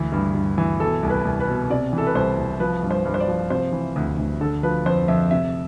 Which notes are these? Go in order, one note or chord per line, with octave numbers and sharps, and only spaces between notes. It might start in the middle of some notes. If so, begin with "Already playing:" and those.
Already playing: D2 E3
G2
G2
E3
B2 A4
C2
B4
C2
B4
B2
C3 D5
E3
A4
B4
C2 C5
C2
F3 B4
G2
C5
G2
C5
D5
F3
C3 C5
E3
D2
D2
D3 A4
F3 B4
F2 C5
F2 E5
C3 E5